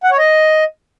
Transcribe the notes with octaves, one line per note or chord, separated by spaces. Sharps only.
F#5
C#5
D#5